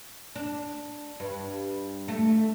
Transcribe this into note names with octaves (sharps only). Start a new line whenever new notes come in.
D4
G2
A3